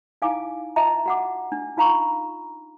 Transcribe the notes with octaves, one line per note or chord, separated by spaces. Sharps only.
D#4 E4 F5 G#5 D6
F4 D#5 E5 A5 A#5
F#4 F#5 D6
D4
D#4 F4 F5 A#5 B5 C#6